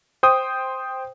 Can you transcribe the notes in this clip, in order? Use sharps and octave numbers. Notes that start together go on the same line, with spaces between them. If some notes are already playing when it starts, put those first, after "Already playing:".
C5 G5 D#6